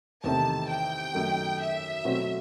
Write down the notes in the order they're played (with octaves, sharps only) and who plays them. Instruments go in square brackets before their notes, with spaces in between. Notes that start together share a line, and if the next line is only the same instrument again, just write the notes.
[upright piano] E2 C3 D#3 A3 [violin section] A5
[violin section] G5
[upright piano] F#2 D#3 A3
[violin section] E5
[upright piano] B2 F#3 A3 C4 F#4